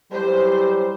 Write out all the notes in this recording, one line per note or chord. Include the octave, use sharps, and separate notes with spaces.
E3 F#3 G3 C5